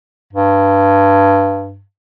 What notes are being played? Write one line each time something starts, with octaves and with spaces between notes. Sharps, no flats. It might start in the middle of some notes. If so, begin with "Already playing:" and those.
G2